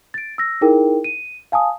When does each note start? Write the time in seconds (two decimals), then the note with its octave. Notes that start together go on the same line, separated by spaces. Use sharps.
0.14 A6 D7
0.38 E6 A#6
0.61 D#4 E4 G#4 A#4 G5
1.04 D#7
1.52 F5 G#5 A5 D#6